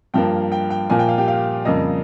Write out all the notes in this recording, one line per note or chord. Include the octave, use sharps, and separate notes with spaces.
G2 F3 A#3 G5
G5
G5
A#2 F3 A#3 G#5
G5
F5
G4
F5
F2 C#3 G3 A#3 D#5